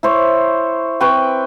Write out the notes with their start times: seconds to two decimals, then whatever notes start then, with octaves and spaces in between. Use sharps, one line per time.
0.03 E4 C5 C#5
1.00 C4 B4 G5 C#6